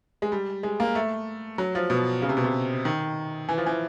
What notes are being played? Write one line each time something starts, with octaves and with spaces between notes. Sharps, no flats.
G#3
G3
G#3
A#3
A3
F#3
F3
B2
C#3
C3
B2
C3
D#3
E3
F3
E3